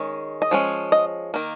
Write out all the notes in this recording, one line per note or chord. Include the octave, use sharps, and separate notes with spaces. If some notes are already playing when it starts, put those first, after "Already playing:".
Already playing: D#3 G#3 C#4
D#5
F3 G#3 C#4
D#5
D#3 A#3